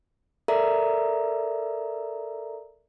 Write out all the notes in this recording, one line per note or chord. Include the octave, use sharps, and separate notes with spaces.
A4 A#4 D5 E5 A#5